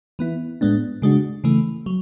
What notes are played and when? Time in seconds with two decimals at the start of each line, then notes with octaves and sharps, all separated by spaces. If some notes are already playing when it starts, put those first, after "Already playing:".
0.19 E3 B3 E4
0.61 A2 G#3 B3 D4
1.02 C#3 G#3 D4 F#4
1.44 C#3 E3 A3
1.86 F#3